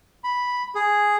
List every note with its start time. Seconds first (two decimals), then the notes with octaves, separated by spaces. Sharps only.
0.24 B5
0.75 G#4